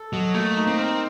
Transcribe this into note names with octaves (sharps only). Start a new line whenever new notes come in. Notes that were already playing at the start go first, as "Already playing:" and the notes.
Already playing: A4
F#3 D#5
A3 A#3
D#4
C4
A#4